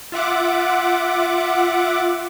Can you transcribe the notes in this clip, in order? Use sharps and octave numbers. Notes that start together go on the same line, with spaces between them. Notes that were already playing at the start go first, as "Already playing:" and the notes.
F4 E5 F#5 D6